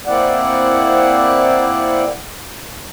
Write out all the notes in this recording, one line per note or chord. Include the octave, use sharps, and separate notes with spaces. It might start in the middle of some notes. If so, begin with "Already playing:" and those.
A#3 C4 E4 D5 F#5